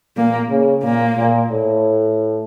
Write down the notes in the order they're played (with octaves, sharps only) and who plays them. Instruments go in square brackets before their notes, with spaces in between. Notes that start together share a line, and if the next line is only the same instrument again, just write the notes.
[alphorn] A#2 [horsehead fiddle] A#3
[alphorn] C#3
[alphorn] A#2 [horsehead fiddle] A#3
[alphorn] A#2
A2